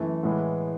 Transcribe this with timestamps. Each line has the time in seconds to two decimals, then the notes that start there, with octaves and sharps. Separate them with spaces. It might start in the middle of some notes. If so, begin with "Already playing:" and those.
Already playing: F#2 E3 A3
0.23 A2 E3 G#3 B3